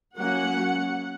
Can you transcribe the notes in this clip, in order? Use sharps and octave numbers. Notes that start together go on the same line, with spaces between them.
F#3 A#3 C#4 F#5